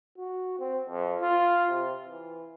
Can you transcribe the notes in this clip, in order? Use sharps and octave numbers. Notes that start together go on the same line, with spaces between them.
F#4
C4
F2
F4
C3
E3